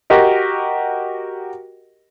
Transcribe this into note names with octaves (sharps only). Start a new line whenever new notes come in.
F#4 G4 A#4 D#5